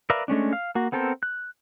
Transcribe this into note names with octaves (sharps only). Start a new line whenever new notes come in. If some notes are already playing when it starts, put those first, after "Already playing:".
A#4 B4 D5 E5 F5
G#3 A3 C#4 D4
F5
A#3 F#4
B3 C4 A4 A#4 C5
F#6